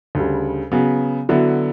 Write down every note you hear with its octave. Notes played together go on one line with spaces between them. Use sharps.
D2 C#3 G3
C#3 F#3 B3
D3 F#3 B3 E4